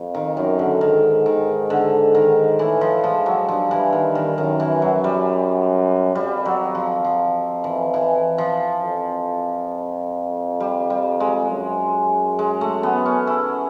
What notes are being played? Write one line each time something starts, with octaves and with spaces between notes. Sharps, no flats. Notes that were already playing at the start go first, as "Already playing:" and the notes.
Already playing: F2
D#3
F#2 D#3
D3
G#2 D#3
D#3
D3
D#3
A2 E3
F3
G#2 F3
F#3
G2 F3
E3
D#3
D#3
F#2 D#3
E3
F#3
G3
F2 G3
F#3
F3
F3
E3
E3
F3
F2
G3
G3
G#3
F#2
G#3
A3
B3
C#4
E4